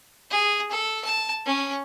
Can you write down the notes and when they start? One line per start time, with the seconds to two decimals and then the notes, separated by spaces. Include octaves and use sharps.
0.30 G#4
0.71 A4
1.05 A5
1.46 C#4